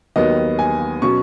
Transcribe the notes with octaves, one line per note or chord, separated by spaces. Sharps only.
D#2 D#3 F#3 B3 D#5
G#5
B2 F#3 C#4 C#6